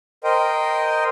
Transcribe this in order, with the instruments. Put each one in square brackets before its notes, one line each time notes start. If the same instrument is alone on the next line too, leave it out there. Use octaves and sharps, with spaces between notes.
[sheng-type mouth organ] A#4 C5 D#5 G5